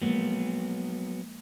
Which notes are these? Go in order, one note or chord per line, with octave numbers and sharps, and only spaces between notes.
F3 F#3 G#3 A#3 B3